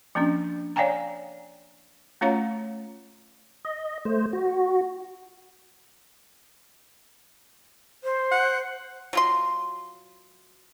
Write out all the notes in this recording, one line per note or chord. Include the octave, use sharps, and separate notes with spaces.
F3 A#3 C#4 D4
C#5 D5 F5 G5 G#5 A#5
A3 C#4 F4 C#5 F5 A#5
D#5
A3 C5
F#4
C5
F#5
F#3 F4 C6